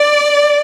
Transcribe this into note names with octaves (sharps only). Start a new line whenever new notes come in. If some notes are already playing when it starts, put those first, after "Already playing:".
Already playing: D5